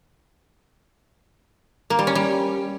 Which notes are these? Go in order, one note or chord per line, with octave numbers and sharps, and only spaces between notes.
A#3
G3
C#4
G3